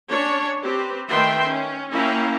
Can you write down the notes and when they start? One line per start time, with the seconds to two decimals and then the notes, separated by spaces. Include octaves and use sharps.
0.11 C#4 D4 C#5
0.63 C4 G4 B4
1.08 D#3 A3 B4 E5 G5 C6
1.49 C#4
1.92 A#3 C#4 E4 F5 G5 A#5